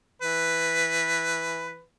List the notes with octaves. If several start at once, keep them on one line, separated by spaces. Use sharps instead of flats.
E3 B4